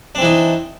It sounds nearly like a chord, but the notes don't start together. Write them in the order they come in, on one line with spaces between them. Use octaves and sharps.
D4 C4 E3 D#4